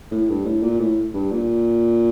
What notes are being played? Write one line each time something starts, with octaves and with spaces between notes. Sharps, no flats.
A2
G2
A2
A#2
A2
G2
A#2